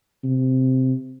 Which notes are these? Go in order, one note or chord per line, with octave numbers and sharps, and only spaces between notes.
C3